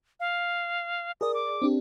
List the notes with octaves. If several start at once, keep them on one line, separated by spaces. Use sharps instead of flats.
F5
G#4 A#4 D5 D#6
D6
C4 D4 G4